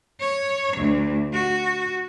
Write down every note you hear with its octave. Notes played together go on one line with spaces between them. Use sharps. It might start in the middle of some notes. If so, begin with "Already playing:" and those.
C#5
D2
F#4